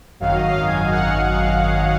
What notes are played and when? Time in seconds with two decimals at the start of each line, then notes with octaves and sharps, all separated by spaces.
0.20 G#1 F#2 D#3 F#3 F5
0.34 D#5
0.48 F5
0.67 G#1 F#2 D#3 F#3 G#5
0.91 F#5